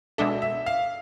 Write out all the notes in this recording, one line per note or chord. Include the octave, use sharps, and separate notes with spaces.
B2 G#3 D4 A4 E5
E5
F5